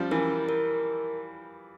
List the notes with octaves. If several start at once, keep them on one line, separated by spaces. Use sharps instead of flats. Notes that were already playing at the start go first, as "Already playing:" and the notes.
Already playing: F3 G3 C#4
E3 A#4
A#4